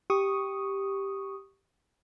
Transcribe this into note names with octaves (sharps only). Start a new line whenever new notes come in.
G4 C#6 D#6